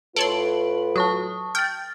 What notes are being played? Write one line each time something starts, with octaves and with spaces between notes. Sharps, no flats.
A2 F4 A4 B4 C#5 C6 D7 F#7
F#3 A5 C#6 D#6
G5 F6 A6